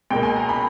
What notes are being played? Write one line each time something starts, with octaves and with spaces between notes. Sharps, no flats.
C#2 B2 A#3 G5
G#5
A#5
B5